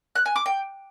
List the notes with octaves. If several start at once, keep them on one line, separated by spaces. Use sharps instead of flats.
F#6
G#5
D6
G5